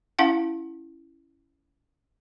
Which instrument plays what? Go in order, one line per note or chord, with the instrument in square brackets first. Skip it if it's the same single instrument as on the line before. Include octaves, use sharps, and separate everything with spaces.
[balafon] C#4 E4 F5 F#5